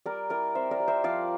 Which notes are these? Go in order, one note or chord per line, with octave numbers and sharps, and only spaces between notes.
G3 A#4 D5
E4 A#4 D5
C4 C5 E5
A#4 D5
G3
C5 E5
F3 D5 F5